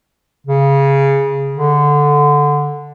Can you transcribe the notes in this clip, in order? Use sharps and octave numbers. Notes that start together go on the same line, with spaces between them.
C#3
D3